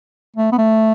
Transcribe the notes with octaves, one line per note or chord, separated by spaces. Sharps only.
A3
B3
A3